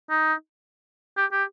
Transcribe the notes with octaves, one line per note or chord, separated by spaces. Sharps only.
D#4
G4
G4